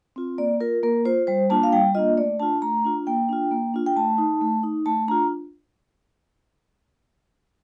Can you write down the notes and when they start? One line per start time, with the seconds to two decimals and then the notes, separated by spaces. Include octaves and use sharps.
0.16 C4 F4
0.38 A#3 D5
0.61 F4 A#4
0.83 A#3 A#4
1.05 F4 C5
1.27 G3 C5
1.50 A#3 D4 F4 A5
1.63 F5
1.72 G3 G5
1.95 A#3 D4 F4 D#5
2.17 A3 D5
2.40 D4 F4 A5
2.62 A3 A#5
2.85 D4 F4
3.07 A#3 G5
3.29 D4 F4
3.51 A#3
3.74 D4 F4
3.86 G5
3.96 A3 A5
4.18 D#4
4.41 A3
4.63 D#4
4.86 A3 A5
5.08 D4 F4 A#5